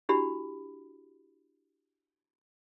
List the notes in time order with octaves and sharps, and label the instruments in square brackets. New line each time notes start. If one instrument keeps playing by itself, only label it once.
[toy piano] D4 E4 F#4 G4 B5